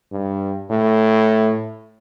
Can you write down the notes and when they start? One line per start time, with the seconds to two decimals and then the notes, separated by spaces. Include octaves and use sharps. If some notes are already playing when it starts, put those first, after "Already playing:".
0.12 G2
0.70 A2